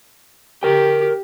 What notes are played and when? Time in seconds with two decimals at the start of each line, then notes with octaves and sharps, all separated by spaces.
0.63 G4 A#4 G5